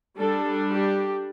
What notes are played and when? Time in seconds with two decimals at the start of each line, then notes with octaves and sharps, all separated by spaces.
0.18 G3 D4 A4
0.72 G4